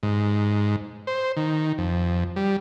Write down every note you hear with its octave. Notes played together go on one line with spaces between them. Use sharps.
G#2
C5
D#3
F2
G3